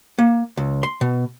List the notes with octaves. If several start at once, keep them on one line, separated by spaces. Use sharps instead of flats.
A#3
C#2
C6
B2